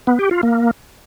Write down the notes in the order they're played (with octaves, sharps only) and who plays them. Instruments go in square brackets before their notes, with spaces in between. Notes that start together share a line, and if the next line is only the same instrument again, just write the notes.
[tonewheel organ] B3
G4
F4
A#3